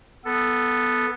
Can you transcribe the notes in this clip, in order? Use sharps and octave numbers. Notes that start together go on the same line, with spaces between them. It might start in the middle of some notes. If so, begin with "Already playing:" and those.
B3 A4